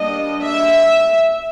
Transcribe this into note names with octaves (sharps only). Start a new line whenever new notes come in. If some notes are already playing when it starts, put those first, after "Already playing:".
Already playing: G3 A#3 D4 D#5
E5